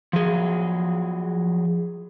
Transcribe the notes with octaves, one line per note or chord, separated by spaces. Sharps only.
F3 F#3 G#4